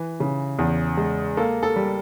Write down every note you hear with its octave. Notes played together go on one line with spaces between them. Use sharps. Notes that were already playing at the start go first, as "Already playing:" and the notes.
Already playing: E3 B4
C#3
E2
G#3
A#3 A4
A4
G3